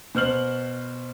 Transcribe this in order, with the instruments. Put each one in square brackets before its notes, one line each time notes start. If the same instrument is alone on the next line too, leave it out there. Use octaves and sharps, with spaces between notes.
[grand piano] B2 C5 F6 F#7